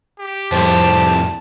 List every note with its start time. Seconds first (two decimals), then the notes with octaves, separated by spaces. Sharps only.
0.20 G4
0.52 F2 A2 C4 A5